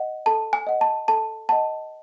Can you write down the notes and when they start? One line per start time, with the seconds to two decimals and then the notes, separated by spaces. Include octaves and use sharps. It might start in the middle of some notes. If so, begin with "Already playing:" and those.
Already playing: D#5 F#5
0.26 A4 A5
0.53 G#5
0.67 D#5 F#5
0.81 A5
1.08 A4 A5
1.49 D#5 F#5 A5